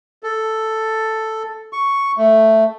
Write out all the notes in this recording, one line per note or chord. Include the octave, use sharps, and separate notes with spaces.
A4
C#6
A3